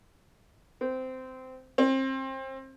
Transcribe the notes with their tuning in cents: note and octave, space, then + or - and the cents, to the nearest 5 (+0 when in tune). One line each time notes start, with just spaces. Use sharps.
C4 -15
C4 +30